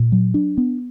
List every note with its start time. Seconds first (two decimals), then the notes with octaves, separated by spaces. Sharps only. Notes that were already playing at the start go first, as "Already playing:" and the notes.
Already playing: A#2
0.12 F#3
0.34 D4
0.58 B3